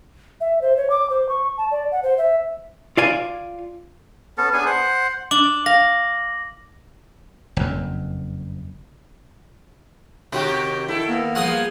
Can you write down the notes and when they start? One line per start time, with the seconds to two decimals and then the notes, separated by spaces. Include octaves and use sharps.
0.41 E5
0.62 C5
0.77 C#5
0.90 D6
1.10 C5
1.29 C#6
1.57 A5
1.71 D5
1.92 F#5
2.03 C5
2.18 E5
2.97 F4 D5 G#5
4.38 B3 C#4 A4
4.53 B3 D4 G#4 G#5
4.66 C5 F#5
5.31 D4 D6 F#7
5.66 F5 A#6
7.57 F#1 F2
10.33 C3 D#3 F#4 G4
10.88 E4 A4
11.08 A#3 B3
11.35 F3 G3 G#4 F#5 G#5 D#6